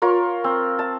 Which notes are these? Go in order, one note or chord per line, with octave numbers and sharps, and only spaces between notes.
F4 A#4 C#5
C4
A5